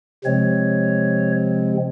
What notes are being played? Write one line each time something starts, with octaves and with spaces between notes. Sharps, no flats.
C3 F3 G#3 C4 C#5